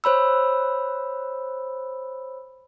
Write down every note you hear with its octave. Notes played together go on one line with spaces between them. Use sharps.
C5 C#5 B5 E6